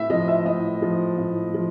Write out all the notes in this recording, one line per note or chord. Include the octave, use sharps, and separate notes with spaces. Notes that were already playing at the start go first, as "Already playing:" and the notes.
Already playing: A2 E5
F3 D#5
E5
A2 D#5
F3
A2
F3